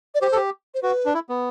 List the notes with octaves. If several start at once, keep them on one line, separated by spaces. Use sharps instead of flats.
D5
G4 C5
A4
G4
C5
F#4 B4
D4
E4
B3